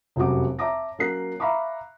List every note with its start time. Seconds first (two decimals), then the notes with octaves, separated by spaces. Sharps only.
0.16 F1 F#2 F#3 G3 F#4 D6
0.59 C#5 E5 A5 A#5 D6 A#6
0.99 F#3 A#3 C#4 A#4 F#6 C7
1.40 E5 F5 A#5 B5 C#6 D6